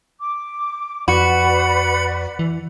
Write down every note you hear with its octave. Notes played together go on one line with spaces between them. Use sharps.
D6
F2 F#4 B4 D5 B5 C#7
E3